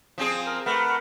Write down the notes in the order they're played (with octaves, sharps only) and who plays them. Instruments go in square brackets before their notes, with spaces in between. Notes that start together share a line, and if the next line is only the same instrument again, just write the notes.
[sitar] F3 C4 G#4
[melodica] A#4
[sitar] A3 [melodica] A#4 B4 F#5